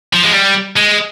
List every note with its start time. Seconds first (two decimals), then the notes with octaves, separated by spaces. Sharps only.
0.13 F3
0.23 G#3
0.33 G3
0.76 G#3